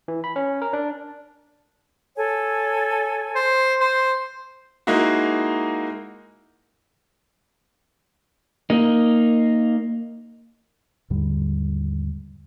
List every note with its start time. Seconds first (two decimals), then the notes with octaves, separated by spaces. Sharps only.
0.08 E3
0.24 B5
0.36 C#4
0.62 A#4
0.73 D4
2.16 A4 C#5 G#5
3.35 C5
3.80 C5
4.87 G#3 A#3 D#4 E4 F#4
8.70 A#3 D#4
11.10 D#2 G#2 D3 G3